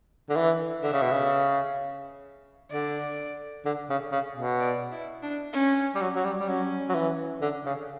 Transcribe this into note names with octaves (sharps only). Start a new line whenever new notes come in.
D3
E3
D3 E5
C#3
B2
C#3
D3 D5
D3
C#3
C#3
B2
D5
E4
D4
C#4
G3
F#3
F#3
G3
G3
F#3 C#4
F#3
E3
D3
C#3